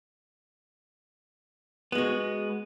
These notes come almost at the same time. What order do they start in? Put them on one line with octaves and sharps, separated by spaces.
B3 G#3 F#4